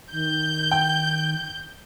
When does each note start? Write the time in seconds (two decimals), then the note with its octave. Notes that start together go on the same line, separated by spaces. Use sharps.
0.11 D#3 G6
0.71 G5